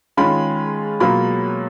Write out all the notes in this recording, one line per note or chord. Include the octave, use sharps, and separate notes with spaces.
D#3 G#3 C#4 F4 B5
B2 F#3 A#3 F4 B5